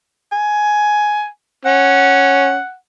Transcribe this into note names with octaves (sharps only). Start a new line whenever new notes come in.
G#5
C#4 F#5